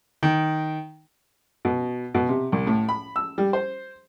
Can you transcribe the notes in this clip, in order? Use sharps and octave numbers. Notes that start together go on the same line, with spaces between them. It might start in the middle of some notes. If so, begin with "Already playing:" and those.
D#3
B2
B2
C3
C2
A2
B5
E6
G3
C5